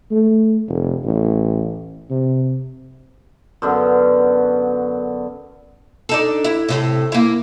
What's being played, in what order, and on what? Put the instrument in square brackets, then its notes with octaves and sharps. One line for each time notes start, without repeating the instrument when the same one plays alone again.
[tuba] A3
F1
A1
C3
[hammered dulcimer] F#2 D3 B3
[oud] D4 D#4 A4
E4
A2 C3
A#3 E4